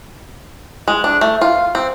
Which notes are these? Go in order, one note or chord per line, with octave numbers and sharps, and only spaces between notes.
G#3
D4
A3
F4
C4